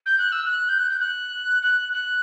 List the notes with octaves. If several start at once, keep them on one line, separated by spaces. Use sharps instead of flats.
G6
F#6
E6
F#6
G6
F#6
G6
F#6
F#6
F#6